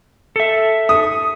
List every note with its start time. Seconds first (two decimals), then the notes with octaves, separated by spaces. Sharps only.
0.36 A4 E5
0.89 D#6